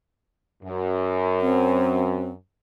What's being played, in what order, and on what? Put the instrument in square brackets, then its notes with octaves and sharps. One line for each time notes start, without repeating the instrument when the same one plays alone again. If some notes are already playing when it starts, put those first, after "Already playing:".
[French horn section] F#2
[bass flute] C4